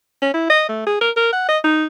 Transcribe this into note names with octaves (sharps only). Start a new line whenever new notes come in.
C#4
E4
D#5
A3
G#4
A#4
A#4
F#5
D#5
D#4